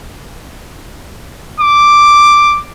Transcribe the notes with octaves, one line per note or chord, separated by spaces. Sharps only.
D6